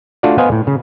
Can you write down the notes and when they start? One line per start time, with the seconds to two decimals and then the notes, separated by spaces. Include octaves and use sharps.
0.23 A3 D4 F4 F#4 D5
0.38 B3 B4 C5 D#5 F5 G#5
0.52 A2
0.67 C#3